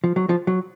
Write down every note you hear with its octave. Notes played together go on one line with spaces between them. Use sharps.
F3
F#3
F3
F#3